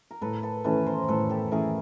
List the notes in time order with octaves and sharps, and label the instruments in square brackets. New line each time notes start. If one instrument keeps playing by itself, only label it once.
[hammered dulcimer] A#4
[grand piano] A2 [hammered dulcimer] A4 B4
[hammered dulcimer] A4 B4
[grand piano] E3 A3 C#4 E4 [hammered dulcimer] A4 B4
[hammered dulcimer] A#4 C5
[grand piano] A2 [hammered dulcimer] A4 B4
[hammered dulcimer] G4 A4
[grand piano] E3 A3 C#4 E4 [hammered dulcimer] G#4 A#4